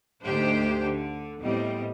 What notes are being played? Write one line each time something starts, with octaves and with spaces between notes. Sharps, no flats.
D2 G#2 G#3 D4 G4 C5
D3
E2 A2 G3 C4 D#5